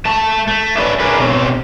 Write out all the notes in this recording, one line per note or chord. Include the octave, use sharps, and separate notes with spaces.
A3 A5
A3
C#4 A4 B4 D5 E5
A3 C#4 D4 G#4 A#4 B4
B2 C4 C#4